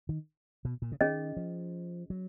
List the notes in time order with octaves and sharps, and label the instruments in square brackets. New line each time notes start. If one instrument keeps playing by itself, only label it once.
[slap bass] D#3
B2
A#2
C#3
[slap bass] D#3 [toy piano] C#4 G#4 D#5
[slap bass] F3
F#3